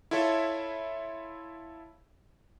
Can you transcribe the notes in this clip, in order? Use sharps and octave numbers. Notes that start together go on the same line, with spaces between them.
E4 F4 A4 C#5 E5